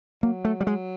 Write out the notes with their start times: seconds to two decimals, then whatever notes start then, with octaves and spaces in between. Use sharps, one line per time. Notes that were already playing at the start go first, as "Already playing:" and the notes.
0.23 F#3 A#3
0.45 A3
0.60 G3
0.67 G#3